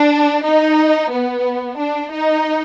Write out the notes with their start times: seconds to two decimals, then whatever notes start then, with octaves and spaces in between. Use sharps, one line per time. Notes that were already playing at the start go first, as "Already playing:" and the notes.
Already playing: D4
0.44 D#4
1.11 B3
1.79 D4
2.12 D#4